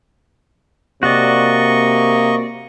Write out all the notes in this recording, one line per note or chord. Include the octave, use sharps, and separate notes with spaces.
C3 A#3 F#4 D5 D#5 C#6